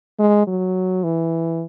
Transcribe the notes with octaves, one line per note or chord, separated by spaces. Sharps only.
G#3
F#3
E3